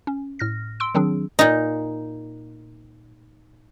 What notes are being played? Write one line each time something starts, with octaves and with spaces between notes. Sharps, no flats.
C#4
A2 F6 A#6
C6 E6 D7
D#3 F#3 C4 D4 G#4
A#2 D#4